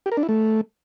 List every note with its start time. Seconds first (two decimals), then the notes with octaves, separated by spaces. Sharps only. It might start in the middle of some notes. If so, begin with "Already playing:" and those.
0.06 G4
0.12 A#4
0.17 D4
0.23 E4
0.29 A3